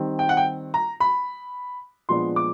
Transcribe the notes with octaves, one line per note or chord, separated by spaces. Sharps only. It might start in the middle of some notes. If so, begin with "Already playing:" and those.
Already playing: D#3 G3 C4
G5
F#5
G5
A#5
B5
A#2 F3 G#3 B3 D4 C6
D6